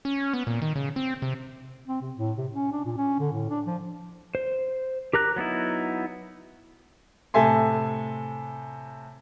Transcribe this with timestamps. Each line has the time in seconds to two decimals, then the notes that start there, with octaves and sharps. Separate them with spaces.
0.05 C#4
0.33 B3
0.47 A#2
0.62 D#3
0.76 C#3
0.96 C4
1.22 C3
1.88 C4
2.01 C3
2.16 A2
2.38 C3
2.53 C#4
2.72 D4
2.85 A#2
2.97 C#4
3.19 D3
3.32 A2
3.49 D4
3.66 F3
4.35 C5
5.13 G4 A#4 A#5 F#6
5.36 F#3 B3 D#4 E4
7.34 A2 C3 A4 E5 G#5 C6